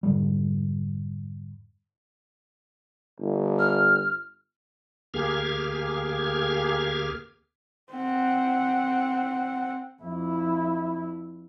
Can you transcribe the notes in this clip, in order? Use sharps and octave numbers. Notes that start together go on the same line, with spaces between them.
F2 G#2 D3 G3
G1
F6
D2 A#3 G4 G#4 F6 G#6
C4 F#5
F2 E4